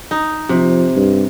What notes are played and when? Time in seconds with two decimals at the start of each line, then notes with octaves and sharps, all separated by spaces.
0.11 D#4
0.49 C3 F3
0.96 G2